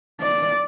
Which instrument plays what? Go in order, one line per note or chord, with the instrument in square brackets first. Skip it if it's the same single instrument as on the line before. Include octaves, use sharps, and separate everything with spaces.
[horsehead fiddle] D5